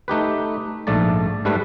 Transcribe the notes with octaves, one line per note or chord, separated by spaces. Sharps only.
A3 D#4 G4 B4
A#1 G#2 A3 D5 A5
G#2 G3 A3 B4